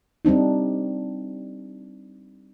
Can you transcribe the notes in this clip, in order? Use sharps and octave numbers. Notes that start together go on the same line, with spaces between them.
G3 C4 D4 D#4